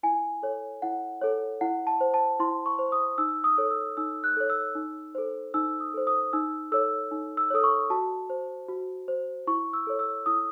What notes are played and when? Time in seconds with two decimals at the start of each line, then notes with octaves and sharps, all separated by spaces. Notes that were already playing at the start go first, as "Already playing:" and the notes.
0.03 E4 G#5
0.43 A4 C#5
0.82 E4 F#5
1.22 A4 C#5
1.61 E4 F#5
1.87 A5
2.01 C5
2.14 A5
2.40 E4 C6
2.66 C#6
2.79 C5
2.92 D#6
3.18 D#4 E6
3.44 D#6
3.58 A4 C#5
3.71 E6
3.97 D#4 E6
4.24 F#6
4.37 A4 C#5
4.50 E6
4.75 D#4
5.15 A4 C5
5.54 D#4 E6
5.80 D#6
5.94 A4 C5
6.07 D#6
6.33 D#4 E6
6.72 A4 C#5 E6
7.11 D#4
7.37 E6
7.50 A4 C#5 D#6
7.64 C#6
7.90 F#4 A5
8.30 C5
8.69 F#4
9.08 C5
9.47 E4 C#6
9.73 E6
9.87 A4 C#5
9.99 E6
10.26 E4 D#6